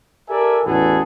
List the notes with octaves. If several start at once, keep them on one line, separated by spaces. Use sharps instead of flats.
G4 A4 A#4 D5 E5 G#5
A1 E2 F#4 G#4 A4 B4